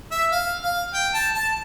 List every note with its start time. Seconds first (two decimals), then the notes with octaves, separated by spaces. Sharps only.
0.11 E5
0.31 F5
0.62 F5
0.94 G5
1.14 A5
1.34 A5